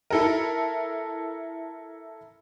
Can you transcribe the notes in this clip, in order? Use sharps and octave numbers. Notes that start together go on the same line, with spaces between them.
E4 A4 A#4